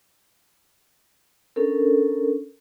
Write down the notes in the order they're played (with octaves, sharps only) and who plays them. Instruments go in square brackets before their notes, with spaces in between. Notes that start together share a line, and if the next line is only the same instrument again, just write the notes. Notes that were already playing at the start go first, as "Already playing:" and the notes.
[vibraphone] C#4 D4 A4 A#4